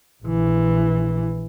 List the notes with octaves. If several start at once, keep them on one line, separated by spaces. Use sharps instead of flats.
A#1 E3